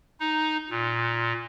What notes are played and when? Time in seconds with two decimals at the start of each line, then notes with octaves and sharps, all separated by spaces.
0.20 D#4
0.70 A#2